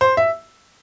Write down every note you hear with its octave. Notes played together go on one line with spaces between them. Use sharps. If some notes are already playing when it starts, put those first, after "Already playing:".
C5
E5